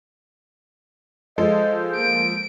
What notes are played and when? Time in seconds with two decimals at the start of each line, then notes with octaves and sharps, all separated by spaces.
1.38 F3 G#3 A4 C5 D#5
1.96 A#3 D7